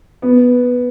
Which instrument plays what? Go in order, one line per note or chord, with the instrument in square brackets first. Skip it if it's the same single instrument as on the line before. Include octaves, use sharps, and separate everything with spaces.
[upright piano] B3